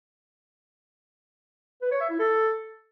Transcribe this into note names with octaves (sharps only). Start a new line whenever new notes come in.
B4
C#5
E5
E4
A4